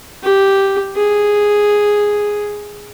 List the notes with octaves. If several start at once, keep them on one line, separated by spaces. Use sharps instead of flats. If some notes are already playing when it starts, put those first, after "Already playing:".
G4
G#4